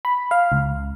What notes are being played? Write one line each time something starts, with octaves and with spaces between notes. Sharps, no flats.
B5
F5
C#2